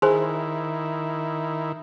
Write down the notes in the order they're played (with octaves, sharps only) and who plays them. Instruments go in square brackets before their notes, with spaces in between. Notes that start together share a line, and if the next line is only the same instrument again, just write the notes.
[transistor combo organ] D#3 E4 [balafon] G#4 [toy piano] C5 G#5 C6